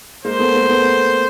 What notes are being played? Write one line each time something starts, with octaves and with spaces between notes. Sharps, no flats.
G#3 A#3 C5
A3 B3
G#3 A#3
A3 B3